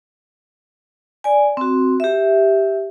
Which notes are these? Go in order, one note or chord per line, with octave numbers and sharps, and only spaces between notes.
D5 G#5
C4 F#4
G4 E5